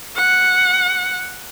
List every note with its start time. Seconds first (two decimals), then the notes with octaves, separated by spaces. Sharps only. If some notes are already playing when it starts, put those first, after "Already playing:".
0.17 F#5